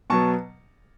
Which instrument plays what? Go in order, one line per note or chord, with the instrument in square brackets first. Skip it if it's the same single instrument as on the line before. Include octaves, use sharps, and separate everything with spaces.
[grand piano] B2 F#3 B3 A5 C#6